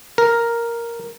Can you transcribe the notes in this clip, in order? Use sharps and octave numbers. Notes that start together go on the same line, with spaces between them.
A#4